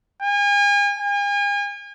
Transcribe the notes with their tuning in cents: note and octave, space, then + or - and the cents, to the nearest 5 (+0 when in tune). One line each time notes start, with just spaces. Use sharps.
G#5 -40
G#5 -40